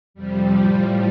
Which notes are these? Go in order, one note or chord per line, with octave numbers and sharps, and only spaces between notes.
F2 C3 F3 G3
A2 F3